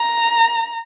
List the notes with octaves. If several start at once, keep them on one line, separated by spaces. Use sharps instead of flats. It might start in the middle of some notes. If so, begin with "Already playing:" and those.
Already playing: A#5